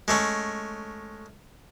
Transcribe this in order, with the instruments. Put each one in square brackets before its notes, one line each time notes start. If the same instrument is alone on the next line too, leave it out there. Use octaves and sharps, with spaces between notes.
[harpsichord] G#3 A3 C#4